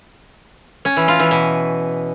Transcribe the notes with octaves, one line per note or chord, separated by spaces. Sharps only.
C#4
E3
F4
E3
B2